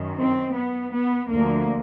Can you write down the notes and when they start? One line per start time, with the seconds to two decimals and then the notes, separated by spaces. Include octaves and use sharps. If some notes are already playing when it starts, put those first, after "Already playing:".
Already playing: F#2 D#3
0.17 C4
0.54 B3
0.92 B3
1.30 D2 D3 F3 A#3